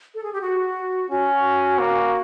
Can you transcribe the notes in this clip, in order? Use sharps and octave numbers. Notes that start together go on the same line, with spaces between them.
A4
G#4
G4
F#4
C#4 F#4
A#3